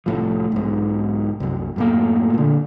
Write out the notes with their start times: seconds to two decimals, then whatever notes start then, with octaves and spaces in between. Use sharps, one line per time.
0.06 C2 A2 F3
0.52 B1 G#2
1.40 C2 F#2
1.76 F#2 A2 A#3
2.33 A#2 D3